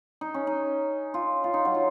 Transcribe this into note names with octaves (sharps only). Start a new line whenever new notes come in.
D#4
C#4
D#4
F4
F4
D#4
F#3
F4